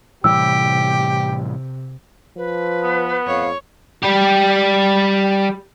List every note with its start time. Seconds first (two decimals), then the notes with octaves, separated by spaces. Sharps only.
0.24 A2 C3 E3 G3 G4 E6
2.37 F3 B4
2.83 B3
3.27 F2 C#5 F5
4.03 G3 G4